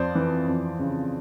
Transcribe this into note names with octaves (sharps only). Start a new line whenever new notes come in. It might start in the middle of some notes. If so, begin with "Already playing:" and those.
Already playing: F2 C5 D5
E3
F2
C#3